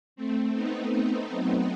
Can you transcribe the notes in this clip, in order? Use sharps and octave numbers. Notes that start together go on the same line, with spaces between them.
A3 C4
B3 D#4
A3 C4
F#3 A3